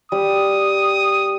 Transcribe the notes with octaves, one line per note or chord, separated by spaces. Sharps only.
G3 D#6